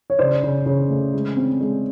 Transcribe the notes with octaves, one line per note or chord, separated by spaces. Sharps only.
C#5
C#3 C5 D5
C#3
C#3
A3
G#3
C4
G#3